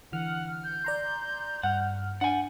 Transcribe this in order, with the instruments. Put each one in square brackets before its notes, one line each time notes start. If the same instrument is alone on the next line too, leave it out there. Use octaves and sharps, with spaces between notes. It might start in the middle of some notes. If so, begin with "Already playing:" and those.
[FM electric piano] D3 E3 F6 [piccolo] F#5
[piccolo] G6
[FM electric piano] D5 A#5 C6
[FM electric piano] G2 F6 [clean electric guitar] F#5
[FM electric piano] D4 [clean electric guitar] F#5 G#5